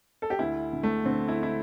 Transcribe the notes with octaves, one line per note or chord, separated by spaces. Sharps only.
A4
G4
D2 E4
D3
A3
D3 C4
E4
E4